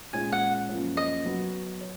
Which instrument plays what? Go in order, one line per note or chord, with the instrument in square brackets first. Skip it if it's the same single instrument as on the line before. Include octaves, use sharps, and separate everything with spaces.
[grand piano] A#2 G#3 C#4 [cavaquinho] G#5
[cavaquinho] F#5
[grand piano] F#2 F3 A#3 C#4
[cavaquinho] D#5
[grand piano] F#3 B3 F#4
C#5